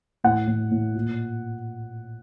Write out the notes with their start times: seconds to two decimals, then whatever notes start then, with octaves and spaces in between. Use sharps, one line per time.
0.24 A2 F#5
0.47 A2
0.71 A2
0.94 A#2